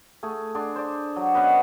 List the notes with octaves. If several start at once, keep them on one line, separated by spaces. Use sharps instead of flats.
A3 G#4
D4 G#4 D5 C6
C5 D5
F#3
B3 C#4 B4 D#5